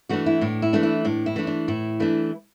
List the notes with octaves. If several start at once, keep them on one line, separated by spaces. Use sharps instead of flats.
E3 A3 D4 F#4
E4
A2 D4
E4
E3 A3 D4
E4
A2 D4
E4
E3 A3 D4
D4
A2 E4
E3 A3 D4